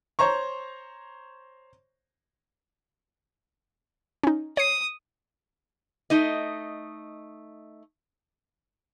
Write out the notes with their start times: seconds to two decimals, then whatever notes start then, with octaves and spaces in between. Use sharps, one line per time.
0.19 C5 C#5 A#5 C#6
4.23 C#4 D#4
4.57 C#5 D#6 C7
6.10 A3 D#4 D#5